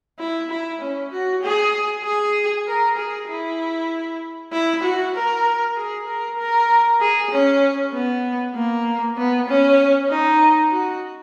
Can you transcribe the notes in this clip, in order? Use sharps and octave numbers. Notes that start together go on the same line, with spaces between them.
E4
E4
C#4
F#4
G#4
G#4
A#4
G#4
E4
E4
F#4
A#4
G#4
A#4
A#4
G#4
C#4
B3
A#3
B3
C#4
D#4
F#4